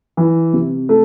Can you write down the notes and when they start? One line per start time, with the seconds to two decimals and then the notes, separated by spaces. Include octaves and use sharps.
0.17 E3
0.53 C3
0.89 A3